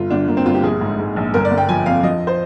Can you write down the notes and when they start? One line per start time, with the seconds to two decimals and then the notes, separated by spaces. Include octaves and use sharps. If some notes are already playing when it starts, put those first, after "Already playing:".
Already playing: G1 F4
0.10 G1 D4
0.28 G1 A#3
0.37 C4
0.46 G1 F4
0.55 G4
0.63 A#1 G#4
0.81 G#2
0.99 G#2
1.16 A#1
1.34 G1 A#4
1.45 D5
1.51 G1
1.58 G5
1.69 F3 G#5
1.86 F2 F5
2.03 F3 D#5
2.27 C5